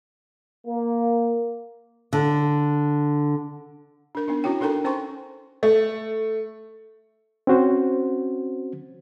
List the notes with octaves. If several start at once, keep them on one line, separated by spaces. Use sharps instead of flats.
A#3
D3
D4 A#4
B3 D4 D#4
C#4 E4 F#4 C#5 G5
D4 D#4 A4 A#4 G5 A#5
C#4 C5 G5 G#5 C6 C#6
A3
C4 C#4 F#4 C5